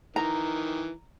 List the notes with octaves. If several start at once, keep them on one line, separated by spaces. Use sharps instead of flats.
D#3 E3 A#5